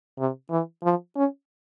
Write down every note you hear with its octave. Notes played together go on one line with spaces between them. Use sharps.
C3
E3
F3
C#4